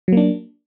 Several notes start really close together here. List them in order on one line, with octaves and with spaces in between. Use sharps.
F#3 A#3 D4